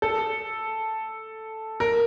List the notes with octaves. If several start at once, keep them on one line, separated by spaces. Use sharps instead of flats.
A4
A#4